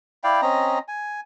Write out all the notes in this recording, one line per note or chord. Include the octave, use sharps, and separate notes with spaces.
E4 D5 F5 G5
C4 C#4 D#5 A#5
G#5